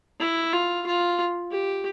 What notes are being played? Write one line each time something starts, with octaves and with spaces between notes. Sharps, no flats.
E4
F4
F4
G4